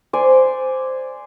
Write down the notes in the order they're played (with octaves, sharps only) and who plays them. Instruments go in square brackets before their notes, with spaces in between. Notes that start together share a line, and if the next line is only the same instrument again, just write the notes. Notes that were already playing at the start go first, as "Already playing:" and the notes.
[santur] C5 D5 G#5